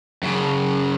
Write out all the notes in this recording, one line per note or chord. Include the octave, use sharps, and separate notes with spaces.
F#2 C#3